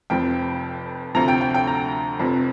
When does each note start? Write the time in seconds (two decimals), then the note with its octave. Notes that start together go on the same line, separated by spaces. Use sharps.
0.10 F1 F2 C3 F3 G5
1.15 D2 C3 F3 A#5
1.28 G5
1.41 G5
1.54 G5
1.67 A#5
2.19 F1 F2 C3 F3